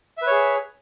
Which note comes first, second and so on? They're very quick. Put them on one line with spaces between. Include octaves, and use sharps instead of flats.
E5 B4 C#5 G#4